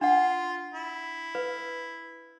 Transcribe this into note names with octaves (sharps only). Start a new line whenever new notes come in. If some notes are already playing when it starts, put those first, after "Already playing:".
D4 F4 F#5
E4
B4